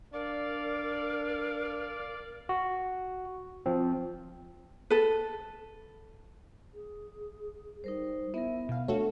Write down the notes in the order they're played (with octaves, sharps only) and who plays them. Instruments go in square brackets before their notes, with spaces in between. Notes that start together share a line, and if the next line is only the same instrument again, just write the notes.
[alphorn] D4 [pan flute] A#4 [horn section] D5 F5
[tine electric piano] F#4
F3 C4
[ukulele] A4 B4
[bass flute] G#4
[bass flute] G3 [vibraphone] D#4 A#4 C5
[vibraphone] B3 A#4 [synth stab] E4 [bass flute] E5
[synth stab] B2 F5
[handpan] A3 [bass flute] D4 [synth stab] F#4 A4 C#5